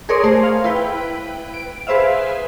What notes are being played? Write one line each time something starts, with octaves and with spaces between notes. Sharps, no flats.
G#4 A#4 C#5 D5 C6 D#6
A3 G#4 C5
F5
E4 B4 G5
D7
G#4 B4 C5 E5 F5